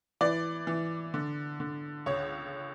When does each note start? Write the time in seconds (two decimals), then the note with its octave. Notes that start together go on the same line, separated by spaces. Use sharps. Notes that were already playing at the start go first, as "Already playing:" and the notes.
0.21 E3 D5
0.67 E3
1.14 D3
1.60 D3
2.06 C#2 C#5